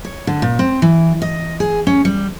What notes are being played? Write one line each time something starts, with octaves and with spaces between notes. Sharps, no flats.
C#5
D3
A#2
C4
E3
D#5
G#4
C#4
G3